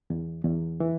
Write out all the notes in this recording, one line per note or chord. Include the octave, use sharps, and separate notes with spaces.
E2
E2
E3